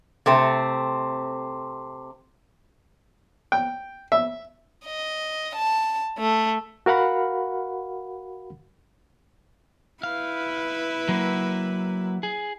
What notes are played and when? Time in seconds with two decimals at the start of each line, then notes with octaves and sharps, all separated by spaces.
0.26 C3 A3 C4
3.52 G5
4.12 E5
4.85 D#5
5.55 A5
6.18 A3
6.86 F#4 A#4 F5 F#5 B5
10.03 E4 B4 F5
11.09 F#3 A#3
12.23 G#4